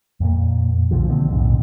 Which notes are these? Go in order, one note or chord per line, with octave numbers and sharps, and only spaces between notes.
F2 A#2 A#3
B1 D3 F3
D3 D#3 A#3 C4
B1 F2 A2 C#3